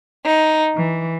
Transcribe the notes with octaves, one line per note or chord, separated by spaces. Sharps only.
D#4
E3